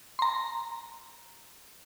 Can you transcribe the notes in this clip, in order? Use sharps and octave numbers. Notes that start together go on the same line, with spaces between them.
A#5 C6